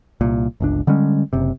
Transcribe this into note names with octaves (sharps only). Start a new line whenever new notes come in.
C2 A#2
G1 C#2 D4
D3 G3 G#3 C#4
F#1 C3